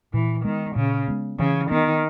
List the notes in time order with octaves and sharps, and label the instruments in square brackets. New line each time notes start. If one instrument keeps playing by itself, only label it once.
[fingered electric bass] A#2 [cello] E3
[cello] D#3 [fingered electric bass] G#3 B3
[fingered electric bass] A#2 [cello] C#3
[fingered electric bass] G#3 B3
[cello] C#3 [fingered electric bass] E3
[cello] D#3 [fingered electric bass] B3